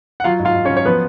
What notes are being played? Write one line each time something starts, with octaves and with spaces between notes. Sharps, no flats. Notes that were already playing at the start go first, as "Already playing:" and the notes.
F#5
F#3 F4 F5
G#2
F4 F5
G#2
C#4 C#5
F#3
C#5
F3 B3 B4